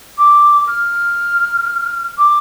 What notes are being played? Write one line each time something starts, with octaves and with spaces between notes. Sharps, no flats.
D6
F6
D6